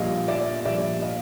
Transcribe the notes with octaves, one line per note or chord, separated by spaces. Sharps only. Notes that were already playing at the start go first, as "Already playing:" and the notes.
Already playing: A#1 A#2 G3 D#5 F5
D5 E5
A#1 A#2 G3 D5 E5
D#5 F5